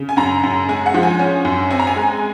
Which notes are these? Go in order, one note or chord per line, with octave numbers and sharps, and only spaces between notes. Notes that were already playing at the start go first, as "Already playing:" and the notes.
Already playing: C#3
G#5
F#2 A#5
F#2
G#3 G#5
F#5
F3
G#5
C#4
F#2
C4 G#5
A#5
G#5
G#3